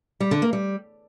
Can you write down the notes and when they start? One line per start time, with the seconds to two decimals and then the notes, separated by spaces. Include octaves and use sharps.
0.20 G3
0.31 D3
0.42 A#3
0.53 G3